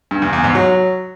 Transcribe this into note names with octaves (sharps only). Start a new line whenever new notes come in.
G2
E2
E2
G#2
F#3